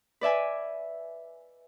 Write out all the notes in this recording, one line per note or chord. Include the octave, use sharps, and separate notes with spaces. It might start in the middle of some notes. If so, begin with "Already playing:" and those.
B4 D5 E5 G#5